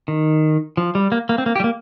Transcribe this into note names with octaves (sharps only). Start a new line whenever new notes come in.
D#3
F3
G3
A#3
A#3
C4
A#3
G4
G3
A#3